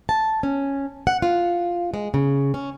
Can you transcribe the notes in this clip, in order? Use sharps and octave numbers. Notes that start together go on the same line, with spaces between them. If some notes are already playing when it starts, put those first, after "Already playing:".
A5
C#4
F#5
F4
G#3
C#3
C#4